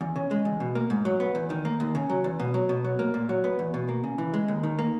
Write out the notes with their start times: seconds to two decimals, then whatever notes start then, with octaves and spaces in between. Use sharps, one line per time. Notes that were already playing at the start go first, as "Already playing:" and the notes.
0.01 E2
0.16 C#3
0.31 G#3
0.45 E2
0.60 B2
0.75 A#3
0.90 G#2
1.05 F#3
1.20 B3
1.35 E2
1.50 D#3
1.65 A#3
1.80 D#2
1.95 C#3
2.10 F#3
2.24 E2
2.40 B2
2.54 F#3
2.69 B2
2.85 F#3
2.99 A#3
3.14 A#2
3.29 F#3
3.44 B3
3.59 E2
3.74 B2
3.89 A#3
4.04 C#3
4.18 E3
4.34 G#3
4.48 D#2
4.63 D#3
4.79 A#3